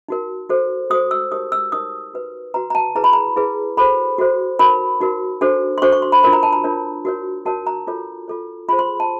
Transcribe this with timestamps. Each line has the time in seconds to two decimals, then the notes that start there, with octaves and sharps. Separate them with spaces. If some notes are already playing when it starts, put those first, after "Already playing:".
0.08 D#4 F#4 A#4
0.49 F#4 A4 C5
0.90 F#4 A4 C5 D#6
1.11 E6
1.32 D#4 G4 A#4 C#5 D#6
1.52 E6
1.72 D#4 G4 A#4 C#5 D#6
2.14 F#4 B4
2.54 F#4 B4 A#5
2.70 A#5
2.75 A5
2.95 E4 G#4 B4 A#5
3.04 B5
3.13 A#5
3.36 E4 G#4 B4
3.77 F#4 A4 C5 B5
4.18 F#4 A4 C5
4.59 D#4 F#4 A#4 B5
5.00 D#4 F#4 A#4
5.41 D4 F#4 A4 C5
5.78 C6
5.82 D4 F#4 A4 C5 C#6
5.92 C#6
6.02 C6
6.12 B5
6.23 D4 F4 A#4 C#5 B5
6.33 A#5
6.43 A5
6.53 A#5
6.64 D4 F4 A#4 C#5
7.05 F#4 A#4 C#5
7.46 F#4 A#4 C#5 A5
7.67 A#5
7.87 F4 A4 C#5
8.28 F4 A4 C#5
8.69 F4 G#4 C5 B5
8.79 C6
9.00 A5